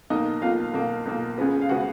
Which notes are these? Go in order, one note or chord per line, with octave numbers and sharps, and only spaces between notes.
B1 B2 A#3 D#4 D#5
B1 B2 A#3 F4 F5
B1 B2 A#3
B1 B2 A#3
C#2 C#3 G#3 B3
F5
C#3 G#3 B3 F#4 F#5